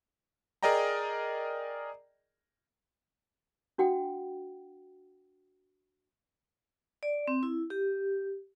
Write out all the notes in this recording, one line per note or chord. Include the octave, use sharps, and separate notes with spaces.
G#4 A#4 D5 D#5 G5 A#5
D4 F#4 F#5 G5
D5
C4
E4
G4